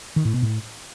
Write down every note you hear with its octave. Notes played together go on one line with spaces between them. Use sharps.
D#3
A2
B2
A2